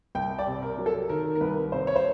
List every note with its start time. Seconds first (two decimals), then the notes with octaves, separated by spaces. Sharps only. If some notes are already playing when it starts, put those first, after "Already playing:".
0.15 C2 G5
0.39 D5
0.47 C3
0.62 A#4
0.78 F#3
0.86 A4
1.09 D#3 A#4
1.36 A#4
1.41 C2 B4
1.72 C3 C5
1.87 C#5
1.96 C5